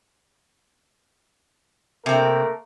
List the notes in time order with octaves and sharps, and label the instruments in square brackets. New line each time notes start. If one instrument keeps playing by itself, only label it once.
[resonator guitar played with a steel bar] C3 C4 [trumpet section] A3 A#3 A#4